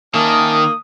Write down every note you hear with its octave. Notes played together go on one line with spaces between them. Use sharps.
D#3 A#3 C#4 E5 A5 D#6